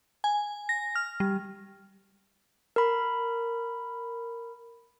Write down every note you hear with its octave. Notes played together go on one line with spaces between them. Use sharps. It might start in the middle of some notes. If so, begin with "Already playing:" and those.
G#5
A#6
F6
G3
A#4 B5